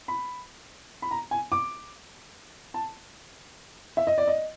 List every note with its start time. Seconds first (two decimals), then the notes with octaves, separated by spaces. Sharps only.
0.08 B5
1.02 B5
1.11 A#5
1.31 G#5
1.52 D6
2.74 A5
3.97 E5
4.07 D#5
4.18 D5
4.27 D#5